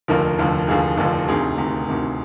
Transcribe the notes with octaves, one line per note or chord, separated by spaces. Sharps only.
F1 D#2 D3 F3 A#4
F1 D#2 D3 F3
F1 D#2 D3 F3 G#4
F1 D#2 D3 F3
D2 C3 D#3 G#4
D2 C3 D#3
D2 C3 D#3